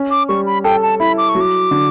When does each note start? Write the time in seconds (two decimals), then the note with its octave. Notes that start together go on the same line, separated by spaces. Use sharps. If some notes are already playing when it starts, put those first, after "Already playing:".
Already playing: C#4
0.11 D6
0.29 G3 C#6
0.46 B5
0.64 A4 G5
0.82 A5
1.00 E4 B5
1.18 D6
1.29 C#6
1.35 F#3
1.41 D6
1.71 D3